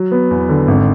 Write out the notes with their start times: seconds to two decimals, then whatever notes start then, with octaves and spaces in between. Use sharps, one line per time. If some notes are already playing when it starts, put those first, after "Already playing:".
Already playing: F#3
0.11 B3
0.31 E2
0.49 D3
0.68 G#1